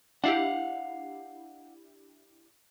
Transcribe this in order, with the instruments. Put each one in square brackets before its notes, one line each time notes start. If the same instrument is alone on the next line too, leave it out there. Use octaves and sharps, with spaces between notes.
[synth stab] D4 E4 G4 [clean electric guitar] F5 F#5